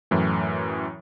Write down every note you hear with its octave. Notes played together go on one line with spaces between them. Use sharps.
F#2 A2 E3